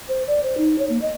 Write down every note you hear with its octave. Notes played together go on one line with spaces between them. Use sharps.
C5
D5
C5
D#4
C#5
A#3
D#5